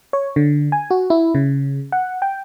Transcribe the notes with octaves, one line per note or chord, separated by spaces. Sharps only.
C#5
D3
G#5
F#4
E4
C#3
F#5
G5